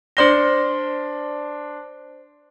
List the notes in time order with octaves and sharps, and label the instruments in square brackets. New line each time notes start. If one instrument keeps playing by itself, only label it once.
[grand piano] D4 C6 G7 [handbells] C5 D5 A#6